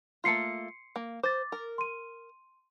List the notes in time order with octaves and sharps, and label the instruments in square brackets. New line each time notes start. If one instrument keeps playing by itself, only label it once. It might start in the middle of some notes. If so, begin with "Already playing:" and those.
[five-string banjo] A3 A#3 F4 [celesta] C6 C7 C#7
[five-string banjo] A#3
[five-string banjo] C5 [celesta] D6 A6
[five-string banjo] A#4
[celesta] C6 D#7